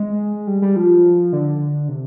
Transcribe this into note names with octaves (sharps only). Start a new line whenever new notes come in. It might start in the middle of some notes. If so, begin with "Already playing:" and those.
Already playing: G#3
G3
G3
F3
D3
C3